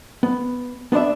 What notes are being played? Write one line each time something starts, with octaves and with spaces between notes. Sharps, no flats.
B3
B3 D4 C5 D5 E5